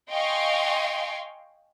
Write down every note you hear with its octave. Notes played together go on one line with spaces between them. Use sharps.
D#5 F5 G5 G#5 C6 C#6